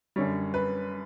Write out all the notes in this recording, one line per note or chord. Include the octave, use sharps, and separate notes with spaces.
F#2 D3 G3 C#5
B4